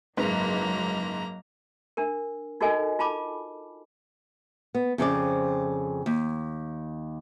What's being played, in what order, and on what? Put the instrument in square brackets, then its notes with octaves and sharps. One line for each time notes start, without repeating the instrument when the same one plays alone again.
[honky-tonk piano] F#1 G#2 B4 [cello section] F#3 [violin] A#3 A#5
[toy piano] D4 A#4
D#4 F#4 A4 A#4 D#5 G#5
F4 A5 B5 D6
[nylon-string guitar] B3
F2 C#3 C4 D5
D#2